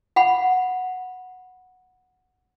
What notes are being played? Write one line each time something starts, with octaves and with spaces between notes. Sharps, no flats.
F5 F#5 B5